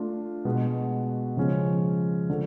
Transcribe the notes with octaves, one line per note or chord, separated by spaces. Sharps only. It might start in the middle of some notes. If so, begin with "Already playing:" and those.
Already playing: A3 D4 F4
B2 G#3 B3 F#4
C#3 F3 G#3 C#4
D3 F3